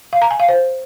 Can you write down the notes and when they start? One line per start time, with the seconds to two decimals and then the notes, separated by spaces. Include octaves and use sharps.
0.13 F5
0.22 A#5
0.31 G#5
0.40 F5
0.49 C5